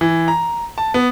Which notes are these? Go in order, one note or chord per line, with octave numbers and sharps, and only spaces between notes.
E3
A#5
A5
B3